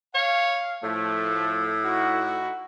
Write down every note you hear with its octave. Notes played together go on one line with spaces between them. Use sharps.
C#5 F5
A2 F3 A3
D#4 E4 F#4